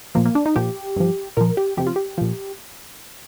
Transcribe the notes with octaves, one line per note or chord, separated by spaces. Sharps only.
A#2 F3 A#3
A#3
D4
D#4
A#2 F3 G4
G2 F3
A#2 F3 A#4
G4
F2 C3 F3 G4
F4
G4
A#2 F3